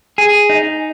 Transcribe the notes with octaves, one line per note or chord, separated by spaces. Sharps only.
G#4
D#4